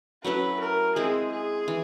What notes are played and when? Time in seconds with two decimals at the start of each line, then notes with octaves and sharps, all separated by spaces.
0.24 F#3 A3 C#4 E4 B4
0.60 A#4
0.96 G#3 C4 E4 G#4
1.32 G#4
1.68 E3